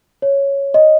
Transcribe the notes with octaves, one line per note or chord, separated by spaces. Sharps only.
C#5
D#5